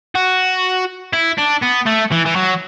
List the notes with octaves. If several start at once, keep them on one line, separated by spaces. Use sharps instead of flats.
F#4
E4
D4
B3
A3
E3
E3
F#3